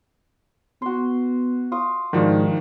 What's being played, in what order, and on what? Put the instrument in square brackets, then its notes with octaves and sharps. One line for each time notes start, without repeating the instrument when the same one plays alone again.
[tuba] B3 [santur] F#4 C6
[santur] F4 C#6 D#6
[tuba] G#2 [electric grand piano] D#3 F3 [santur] D4 F#4